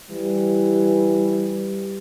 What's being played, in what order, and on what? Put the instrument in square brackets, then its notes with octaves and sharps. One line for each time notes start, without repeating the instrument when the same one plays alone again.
[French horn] E3 [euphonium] G3